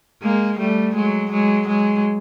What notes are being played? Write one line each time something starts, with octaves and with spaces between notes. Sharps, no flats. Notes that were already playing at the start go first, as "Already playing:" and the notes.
G#3 A#3
G3 A3
F#3 G#3
F#3 G#3
F#3 G#3